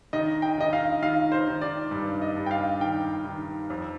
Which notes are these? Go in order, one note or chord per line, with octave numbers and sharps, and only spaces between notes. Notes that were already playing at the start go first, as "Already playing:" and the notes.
D#3 D#5
G5
D#3 D#5
F5
D#3 F5
C5
D#3
D5
G2
D#5
G2
G5
F5
D#3 G5
D#3
F2